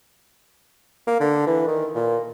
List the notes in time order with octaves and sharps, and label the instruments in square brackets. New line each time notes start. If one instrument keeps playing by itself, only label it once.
[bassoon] A#3
D3
E3
D#3
A#2